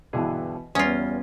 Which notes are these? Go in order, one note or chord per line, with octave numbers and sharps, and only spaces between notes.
G2 B2 D3 E3 G#4
E2 G3 B3 C#4 F4 D#6